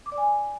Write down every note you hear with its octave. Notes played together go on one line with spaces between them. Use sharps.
D6
D5
G#5